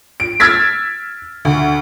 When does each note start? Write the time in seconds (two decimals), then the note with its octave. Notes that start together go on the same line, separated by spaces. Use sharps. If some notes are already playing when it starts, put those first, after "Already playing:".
0.20 D7
0.40 E6 F6 G#6 A6 B6
1.45 D2